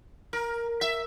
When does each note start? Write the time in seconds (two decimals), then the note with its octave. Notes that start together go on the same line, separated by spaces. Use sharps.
0.33 A#4
0.81 E5